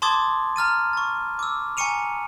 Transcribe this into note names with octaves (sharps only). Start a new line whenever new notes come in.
A5 C6 D6 D#6 G#6 A6
A#5 F6 A6 D#7
C#6 A6
D6 E6
G#5 A#5 C#6 C#7 D#7 F7